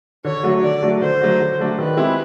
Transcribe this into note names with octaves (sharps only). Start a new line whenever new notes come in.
D3 C#5
F#3 A3 D4 F#4
D3 D5
F#3 A3 D4 F#4
D3 C5
F#3 A3 D4 F#4
D3
F#3 A3 D4 F#4
D#3 B4
G#3 C4 E4 G4